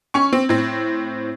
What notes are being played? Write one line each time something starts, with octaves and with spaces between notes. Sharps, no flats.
C#4 C#6
C4
A2 C4